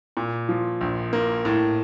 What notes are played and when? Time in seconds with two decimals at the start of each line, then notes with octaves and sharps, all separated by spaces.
0.17 A#2
0.49 F3
0.81 A#1
1.13 A#3
1.45 A2